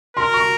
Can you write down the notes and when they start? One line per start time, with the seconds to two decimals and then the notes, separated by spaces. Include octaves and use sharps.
0.17 A#4 C6
0.34 C#6